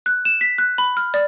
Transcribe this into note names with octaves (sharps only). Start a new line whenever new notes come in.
F#6
E7
B6
F#6
B5
F6
D5